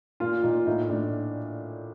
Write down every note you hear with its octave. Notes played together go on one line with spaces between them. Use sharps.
A#2 F4
A#2 D#4
A2 D#4
A2 D4